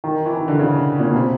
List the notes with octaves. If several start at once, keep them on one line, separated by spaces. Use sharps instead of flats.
D#3
E3
D#3
D3
C#3
A#2
B2
C3